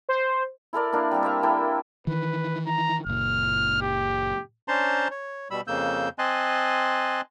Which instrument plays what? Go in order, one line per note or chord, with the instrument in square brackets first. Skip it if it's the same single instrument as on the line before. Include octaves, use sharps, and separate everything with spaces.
[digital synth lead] C5
[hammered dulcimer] E4 A4 A#4 D5
A#3 D4 E4
G3 A#3 C4 G4
C5 E5 F5
A#3 E4 A4 G5
[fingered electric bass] D#3 E3 [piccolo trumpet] B4
[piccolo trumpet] A#5
[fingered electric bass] F#1 A#2 [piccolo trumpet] F6
[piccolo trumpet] G4
[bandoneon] C#4 D4 C5 A5 A#5 C6
C#5
B2 G3 B5 E6
F2 C#3 A#3 E6 G6
C4 D#5 G#5 A5 C6 F#6